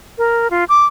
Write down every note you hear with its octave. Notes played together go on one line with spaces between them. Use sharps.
A#4
F4
D6